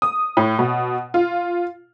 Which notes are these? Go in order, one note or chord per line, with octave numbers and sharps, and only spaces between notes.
D#6
A2
B2
F4